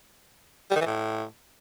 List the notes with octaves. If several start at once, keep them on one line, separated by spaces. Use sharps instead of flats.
G3
D#3
E3
A2